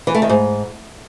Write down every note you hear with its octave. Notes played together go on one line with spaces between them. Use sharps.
E3
A3
D#3
G#2